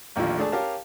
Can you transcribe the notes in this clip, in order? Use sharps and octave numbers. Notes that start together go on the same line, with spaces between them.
A1 D#2 D3 F3 F4
A3 D4 G#4 A5
C#4 G4 A#4 F5 A5